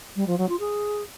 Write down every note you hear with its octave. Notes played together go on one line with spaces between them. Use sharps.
G3
F3
F#3
F4
G#4